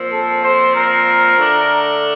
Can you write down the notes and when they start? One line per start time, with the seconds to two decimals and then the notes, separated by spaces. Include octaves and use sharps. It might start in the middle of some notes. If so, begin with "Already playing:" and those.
Already playing: A#2 F3 C4
0.11 A4
0.42 C5
0.74 A#4
1.37 D3 A3 D4